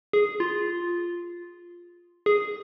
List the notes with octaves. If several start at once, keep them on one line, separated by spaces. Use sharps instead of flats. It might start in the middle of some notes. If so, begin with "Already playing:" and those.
G#4
F4
G#4